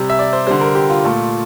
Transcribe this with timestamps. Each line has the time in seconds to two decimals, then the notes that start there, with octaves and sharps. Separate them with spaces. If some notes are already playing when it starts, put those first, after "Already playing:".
Already playing: C3 G3
0.10 E5
0.19 D5
0.33 C5
0.47 D3 G3 C5
0.61 A#4
0.75 G4
0.90 F4
1.04 A#2 A3